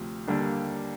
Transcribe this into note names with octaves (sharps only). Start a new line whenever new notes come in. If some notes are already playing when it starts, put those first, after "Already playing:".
Already playing: D2 C3 F3
D#2 D3 G3 A#3 D4